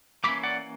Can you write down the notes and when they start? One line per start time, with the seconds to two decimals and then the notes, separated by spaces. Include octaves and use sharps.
0.24 E3 A#3 C#4 B5 D6
0.43 D5 F#5